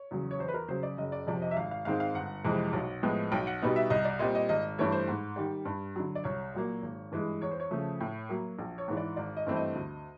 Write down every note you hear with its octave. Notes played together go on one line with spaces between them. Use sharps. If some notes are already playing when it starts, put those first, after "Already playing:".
Already playing: C#5
E2 C#3 F#3
C#5
E2 C5
B4
A#4
C#3 F#3 C5
D5
F#1 D#5
D5
F2 C3 F3 D5
D#5
E5
G#1 F5
F5
G#2 D#3 G#3 C4 F5
F5
G1 F#5
F2 C3 E3 G#3
B1
A2 F3 G#3 B3
B1 G5
F#5
B2 G3 B3 D#4
E5
C2 D#5
D5
A#2 G3 C4 D#5
D#5
G#1 D#5
G2 E3 A3 C#5
C5
G#2
D#3 G3
G2
D3 F#3
D5
C2 C#5
A#2 F#3 A#3
G#1
G2 E3 G#3
E2 C#5
C5
C#5
C#3 F3 A3
A2
F#3 A#3
A#1
C#5
G#2 E3
D5
G#1 D5
D#5
G2 E3 A3 C4
D#5
D2